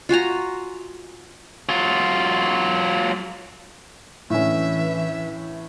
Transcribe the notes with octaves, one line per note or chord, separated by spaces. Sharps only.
F4 F#4 G#5 A#5
F#3 F4
A2 D3 E3 C#4 E5